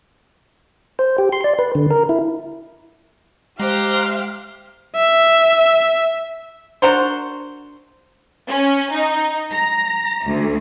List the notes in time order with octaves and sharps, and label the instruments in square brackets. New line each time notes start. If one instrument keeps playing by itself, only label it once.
[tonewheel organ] C5
G4
C6
D5
B4
D3
A#4
E4
[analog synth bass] G#3 [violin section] G4 C5 [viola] F5 [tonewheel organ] A#5 C6 F#6
[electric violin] E5
[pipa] D4 F#4 A#4 C5
[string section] C#4
D#4
A#5
D2